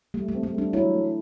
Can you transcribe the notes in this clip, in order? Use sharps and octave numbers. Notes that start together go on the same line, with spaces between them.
G3 A3
A3
C4
A3
G3 D4
F#3 E4
A3